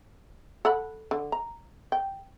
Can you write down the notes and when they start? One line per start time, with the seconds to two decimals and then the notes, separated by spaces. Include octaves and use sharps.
0.65 A4 F#5 B5
1.11 D3
1.32 A#5
1.92 G5